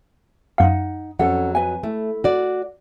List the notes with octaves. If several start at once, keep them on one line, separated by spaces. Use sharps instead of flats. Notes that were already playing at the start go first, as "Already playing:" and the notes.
F#2 D#4 F4 F5 F#5
F2 F#3 C#4 A4 F#5
B4 G#5
A3 E4
F#4 D5